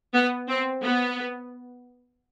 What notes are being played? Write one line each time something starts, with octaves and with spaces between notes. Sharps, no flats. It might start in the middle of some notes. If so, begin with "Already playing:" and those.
B3
C4
B3